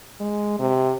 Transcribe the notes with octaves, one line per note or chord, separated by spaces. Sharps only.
G#3
C3